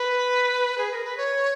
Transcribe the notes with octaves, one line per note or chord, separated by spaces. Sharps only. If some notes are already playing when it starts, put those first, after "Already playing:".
Already playing: B4
G#4
A#4
B4
C#5